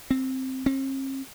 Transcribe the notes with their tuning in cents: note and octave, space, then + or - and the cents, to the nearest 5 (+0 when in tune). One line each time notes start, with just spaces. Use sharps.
C4 +5
C4 +45